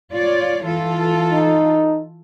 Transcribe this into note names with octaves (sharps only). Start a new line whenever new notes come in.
F4 C#5 D5
E3 F4 A4
D#4